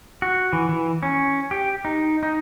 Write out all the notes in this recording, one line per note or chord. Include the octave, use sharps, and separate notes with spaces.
F#4
E3
E3
C#4
G4
D#4
D#4